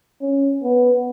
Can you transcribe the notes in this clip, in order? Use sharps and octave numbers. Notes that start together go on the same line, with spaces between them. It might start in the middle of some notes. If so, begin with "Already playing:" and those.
C#4
B3